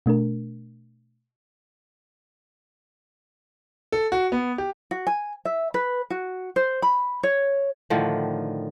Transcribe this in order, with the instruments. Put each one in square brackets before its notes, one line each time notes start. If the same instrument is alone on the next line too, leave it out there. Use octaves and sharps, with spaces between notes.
[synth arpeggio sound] B2 A3 D4 A#4
[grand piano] A4
F#4
B3
G4
[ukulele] F#4
G#5
E5
B4
F#4
C5
B5
C#5
[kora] A2 D3 D#3 F3